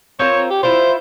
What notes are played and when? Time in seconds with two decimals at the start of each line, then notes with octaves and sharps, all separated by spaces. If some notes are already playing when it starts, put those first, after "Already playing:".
0.19 C4 F4 A#4 C#5
0.50 G4
0.63 E4 F4 C5